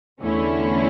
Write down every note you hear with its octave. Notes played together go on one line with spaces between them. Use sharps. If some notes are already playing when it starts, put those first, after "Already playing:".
E2 D3 A3 C#4 E4